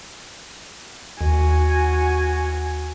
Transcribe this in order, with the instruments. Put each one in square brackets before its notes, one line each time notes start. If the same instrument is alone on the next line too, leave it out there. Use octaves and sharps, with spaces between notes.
[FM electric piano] D#2 [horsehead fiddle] F#4 G#5